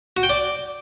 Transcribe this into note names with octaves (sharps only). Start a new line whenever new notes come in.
F#4
G5
D5